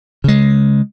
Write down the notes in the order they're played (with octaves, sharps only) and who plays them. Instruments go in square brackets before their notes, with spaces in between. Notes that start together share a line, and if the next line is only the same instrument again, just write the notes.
[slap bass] C#3 G#3